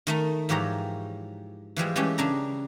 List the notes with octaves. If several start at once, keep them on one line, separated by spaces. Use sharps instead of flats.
D#3 A3 D#4
G#2 E3 F3 G4 C#5 A#5
E3 F3 G3 G#3
E3 G#3 A3 C#4 G4
C#3 D4 A#5